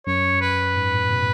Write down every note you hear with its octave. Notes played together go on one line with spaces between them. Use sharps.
F#2 C#5
B4
G#2
A2
B2